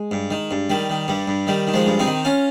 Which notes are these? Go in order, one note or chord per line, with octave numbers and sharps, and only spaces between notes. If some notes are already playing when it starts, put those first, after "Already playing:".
Already playing: G#3
G2
D#3
G2
D#3 G3
D#3
G2 G3
G2
D#3 G3
D#3
F3 G#3
G2
C4 D#4
D#3
C#4 F4